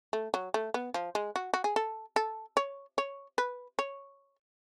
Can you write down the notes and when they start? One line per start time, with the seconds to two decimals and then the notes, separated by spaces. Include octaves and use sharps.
0.13 A3
0.34 F#3
0.54 A3
0.74 B3
0.94 F3
1.15 G#3
1.36 F#4
1.54 F#4
1.64 G#4
1.76 A4
2.16 A4
2.57 C#5
2.98 C#5
3.38 B4
3.79 C#5